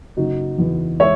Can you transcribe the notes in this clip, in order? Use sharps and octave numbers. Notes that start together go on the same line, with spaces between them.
F#1 D#4 F#4
E2
G#3 C#5 E5